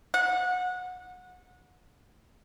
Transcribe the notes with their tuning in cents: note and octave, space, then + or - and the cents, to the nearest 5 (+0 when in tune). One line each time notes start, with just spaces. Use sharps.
F#5 -25